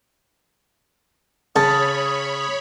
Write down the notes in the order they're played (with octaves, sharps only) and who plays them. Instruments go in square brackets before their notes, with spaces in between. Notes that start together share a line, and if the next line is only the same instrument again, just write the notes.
[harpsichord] C#3 [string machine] C#5 B5 [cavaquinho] A5 [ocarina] D#6